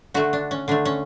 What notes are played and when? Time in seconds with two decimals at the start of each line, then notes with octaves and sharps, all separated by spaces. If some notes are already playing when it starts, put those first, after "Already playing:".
0.14 D3 A3 F#4
0.33 D4
0.51 C#4
0.68 D3 A3 D4
0.85 C#4